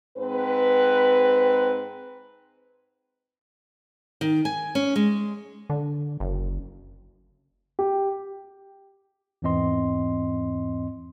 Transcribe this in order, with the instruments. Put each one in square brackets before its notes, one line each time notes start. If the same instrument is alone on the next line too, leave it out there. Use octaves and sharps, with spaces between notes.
[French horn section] G#2 C4 B4
[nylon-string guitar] D#3
G#5
C#4
G#3
[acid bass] D3
F#1
[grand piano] G4
[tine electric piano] E2 G#2 E3 C4 D#5 C6